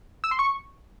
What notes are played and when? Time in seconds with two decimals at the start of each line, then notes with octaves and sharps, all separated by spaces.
0.24 E6
0.31 C6
0.39 C#6